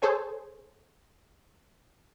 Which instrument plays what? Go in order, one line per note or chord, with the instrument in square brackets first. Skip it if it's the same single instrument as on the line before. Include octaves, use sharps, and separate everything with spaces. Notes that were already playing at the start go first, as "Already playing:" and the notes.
[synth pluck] G#4 A4 C5 C#5 G#5